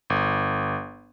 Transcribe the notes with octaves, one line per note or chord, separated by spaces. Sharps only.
G1